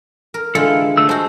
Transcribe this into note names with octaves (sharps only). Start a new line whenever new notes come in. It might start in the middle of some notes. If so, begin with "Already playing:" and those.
A#4
D3 E3 G#3 F4 A4
D3 A3 E6
G#3 F#4 C5 A5 G6